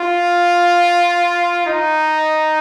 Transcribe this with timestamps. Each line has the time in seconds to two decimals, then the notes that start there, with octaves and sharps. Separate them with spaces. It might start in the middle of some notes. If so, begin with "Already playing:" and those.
Already playing: F4
1.66 D#4